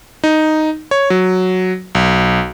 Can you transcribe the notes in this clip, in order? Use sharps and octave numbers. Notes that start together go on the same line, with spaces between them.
D#4
C#5
F#3
B1